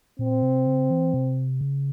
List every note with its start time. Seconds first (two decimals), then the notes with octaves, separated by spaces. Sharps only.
0.19 A#2 C4
0.42 C3
0.66 C#3
0.90 E3
1.14 C3
1.61 C#3